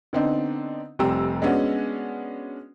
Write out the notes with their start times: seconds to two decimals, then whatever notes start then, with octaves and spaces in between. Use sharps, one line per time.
0.13 D3 B3 C4 D4 D#4
0.99 F1 G3 C4 G4 A#5 E6
1.42 G#3 B3 C#4 D4 F#4